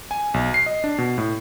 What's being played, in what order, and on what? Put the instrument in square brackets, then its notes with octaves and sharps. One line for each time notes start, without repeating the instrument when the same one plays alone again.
[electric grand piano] G#5
B1
C7
D#5
D4
B2
A2